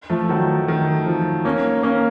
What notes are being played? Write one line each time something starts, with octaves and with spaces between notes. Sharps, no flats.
F3 A3
D#3 F#3
D#3
F3
A#3 C#4
A#3 C#4